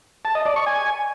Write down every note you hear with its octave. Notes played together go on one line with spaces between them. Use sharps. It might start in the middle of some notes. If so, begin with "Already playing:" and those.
A5
D#5
D5
C#6
G#5